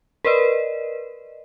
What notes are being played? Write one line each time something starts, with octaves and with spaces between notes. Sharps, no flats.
A#4 B4 D5 D#5